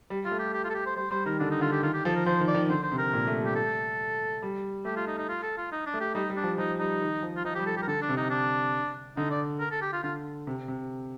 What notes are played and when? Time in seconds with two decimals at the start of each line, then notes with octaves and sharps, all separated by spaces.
0.10 G3
0.25 G3 F4
0.31 A3
0.39 G4
0.54 G4
0.64 F4
0.70 A4
0.75 G4
0.86 C5
0.96 G3 C5
1.11 G3 C5
1.26 D#3 A#4
1.39 D3 D4
1.51 D#4
1.61 D3 F4
1.72 G4
1.83 D#3 F4
1.94 G4
2.05 F3 A4
2.16 A#4
2.26 F3 C5
2.40 D#3
2.48 D5
2.55 D#3
2.70 D3 C5
2.83 C5
2.92 C3
2.98 A#4
3.13 A#2
3.27 A3
3.41 G3
3.46 G4
3.56 A3 A4
4.42 G3
4.85 A3 G4
4.96 F4
5.07 D#4
5.18 D#4
5.29 F4
5.43 A4
5.57 F4
5.72 D#4
5.87 D4
5.94 A3
6.00 G4
6.15 G3 D#4
6.30 G3
6.36 D4
6.43 F3
6.58 F3 D#4
6.80 G3 D#4
7.02 D#3
7.23 F3
7.37 F4
7.45 F3 D#4
7.55 G4
7.59 G3
7.66 A4
7.73 G3
7.77 G4
7.83 A#4
7.87 D3 A4
8.02 D4
8.09 C3
8.17 D#4
8.30 D4
9.17 D3 D#4
9.31 D5
9.60 A#4
9.71 A4
9.82 G4
9.93 F4
10.03 D3 F4
10.47 C3
10.68 C3